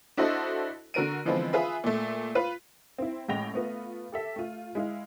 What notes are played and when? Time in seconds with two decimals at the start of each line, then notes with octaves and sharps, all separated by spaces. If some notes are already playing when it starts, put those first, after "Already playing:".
0.17 D4 E4 F#4 A4 C5 D#5
0.94 D3 F#4 A#4 D7 D#7
1.25 D3 E3 F3 G#3 B3 C4
1.53 F4 G#4 B4 E5 B5
1.84 A#2 A3
2.35 F4 B4
2.98 C4 E4
3.28 A1 A2 G#3 G5 A#6 F7
3.54 A3 B3 F4
4.12 G4 A4 E5
4.36 A3 F4
4.75 G#3 E4 F5